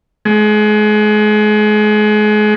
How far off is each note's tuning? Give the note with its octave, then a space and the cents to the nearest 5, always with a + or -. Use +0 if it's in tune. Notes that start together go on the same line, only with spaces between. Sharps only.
G#3 +30